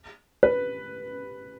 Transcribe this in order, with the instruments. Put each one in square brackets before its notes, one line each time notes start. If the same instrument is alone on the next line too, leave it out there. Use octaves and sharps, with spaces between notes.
[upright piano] B4